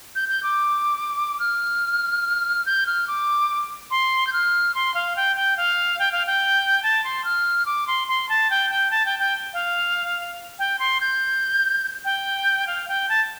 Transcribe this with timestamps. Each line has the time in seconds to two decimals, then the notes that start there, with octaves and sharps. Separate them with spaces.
0.15 G6
0.29 G6
0.43 D6
1.40 F6
2.66 G6
2.87 F6
3.08 D6
3.91 C6
4.27 G6
4.33 F6
4.75 C6
4.94 F5
5.16 G5
5.36 G5
5.57 F5
5.99 G5
6.12 F5
6.27 G5
6.83 A5
7.04 C6
7.24 F6
7.66 D6
7.87 C6
8.08 C6
8.29 A5
8.50 G5
8.70 G5
8.91 A5
9.06 G5
9.20 G5
9.53 F5
10.59 G5
10.79 C6
11.01 G6
12.05 G5
12.67 F5
12.88 G5
13.09 A5